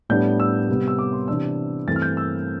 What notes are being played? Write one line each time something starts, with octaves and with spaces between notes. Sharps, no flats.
A2 G3 B3 D4 G6
E6
C3 G3 B3
E6
D6
C6
C3 E3 B3 D4 E6
G2 E3 A3 C4 A6
F6
G6
E6